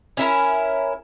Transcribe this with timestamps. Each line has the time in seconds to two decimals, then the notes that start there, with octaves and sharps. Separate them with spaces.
0.17 C#4 E4 A#4